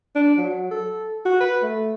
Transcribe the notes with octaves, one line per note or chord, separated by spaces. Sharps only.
D4
F#3
A4
F#4
B4
A3